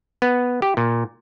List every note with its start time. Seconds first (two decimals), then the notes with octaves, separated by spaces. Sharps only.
0.22 B3
0.62 G4
0.77 A#2